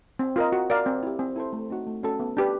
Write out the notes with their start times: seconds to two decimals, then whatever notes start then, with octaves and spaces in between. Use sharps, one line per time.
0.19 C4
0.36 F4 A#4 D#5
0.52 F#4
0.70 A#4 D5 F5
0.86 C4
1.03 E4 G4
1.19 C4
1.36 E4 A4 C5
1.53 A3
1.70 C4 D#4 F#4
1.87 A3
2.03 C#4 F#4 A4
2.20 B3
2.37 D4 G4 B4